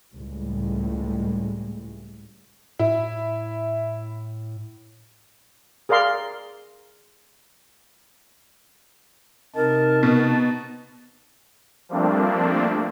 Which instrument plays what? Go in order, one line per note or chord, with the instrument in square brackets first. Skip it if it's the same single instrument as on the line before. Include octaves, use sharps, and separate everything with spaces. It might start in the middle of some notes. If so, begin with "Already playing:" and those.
[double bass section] C#2 A2 G3 G#3
[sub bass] A2 [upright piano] E4
[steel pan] G#4 A#4 D5 F5 C6
[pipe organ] C3 D#4 [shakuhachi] A#4 [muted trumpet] A5
[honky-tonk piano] B2
[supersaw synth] F3 G3 A3 A#3 C4 D4